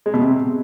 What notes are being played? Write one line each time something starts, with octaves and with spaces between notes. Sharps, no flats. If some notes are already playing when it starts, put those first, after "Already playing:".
G#3
B2
C3